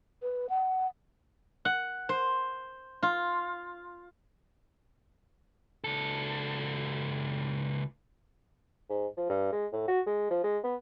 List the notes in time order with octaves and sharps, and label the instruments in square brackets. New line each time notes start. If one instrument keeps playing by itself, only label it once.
[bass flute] B4
F#5
[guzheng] F#5
C5
F4
[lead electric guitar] C#2 A4
[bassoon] G#2
F3
G2
G#3
A2
F#4
G#3
F3
G#3
B3